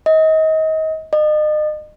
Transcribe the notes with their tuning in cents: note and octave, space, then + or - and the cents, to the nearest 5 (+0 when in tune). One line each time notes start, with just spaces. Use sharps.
D#5 +30
D#5 -35